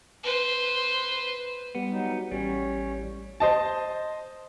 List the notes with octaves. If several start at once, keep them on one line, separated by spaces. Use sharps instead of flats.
B4 C5
G3 B3
F#3 D#4
A1 G3 C#4 C#5
C5 D#5 A5